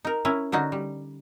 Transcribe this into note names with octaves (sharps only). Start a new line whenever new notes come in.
D#4 A#4
C#4 E4 A#4
D3 C#4 D#4 F#4
G3